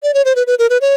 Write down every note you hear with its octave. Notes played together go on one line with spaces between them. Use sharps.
D5
C#5
C5
B4
B4
A#4
B4
C#5